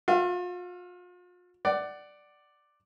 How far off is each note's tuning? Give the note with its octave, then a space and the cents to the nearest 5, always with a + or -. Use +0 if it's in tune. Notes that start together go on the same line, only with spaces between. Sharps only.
F4 +40 F5 -35
D5 +5 F#5 +20